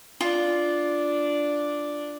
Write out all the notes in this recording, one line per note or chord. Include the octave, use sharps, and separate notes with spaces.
D4 F4